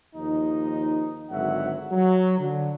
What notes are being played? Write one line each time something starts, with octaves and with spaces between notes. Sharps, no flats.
D#2 F3 D#4
G#1 D3 F#3 E5 F#5
F#3
D3